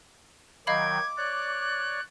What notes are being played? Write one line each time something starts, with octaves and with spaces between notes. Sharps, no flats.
D#3 F#3 D#5 F5 G5 B5 D6 G#6
C#5 D5 F#6